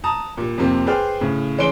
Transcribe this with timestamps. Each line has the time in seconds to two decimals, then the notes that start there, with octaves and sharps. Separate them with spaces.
0.04 A5 A#5 D#6
0.37 A#2 G3
0.58 F2 C3 G3 A#3 C4
0.86 G#4 B4 C5 D5 G5 F6
1.21 A2 C#3
1.58 E3 C#4 G#4 C6 D7 G7